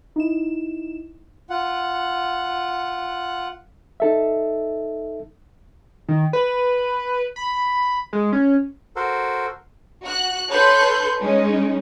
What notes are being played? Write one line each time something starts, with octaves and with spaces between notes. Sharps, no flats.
D#4 E4 E7
F4 F#5
D#4 A4 E5
D#3
B4
B5
G#3
C#4
F#4 A4 A#4 C5
F#4 F#6
A4 B4 C#5 C6 F#6 G6
G#3 C#4 D#4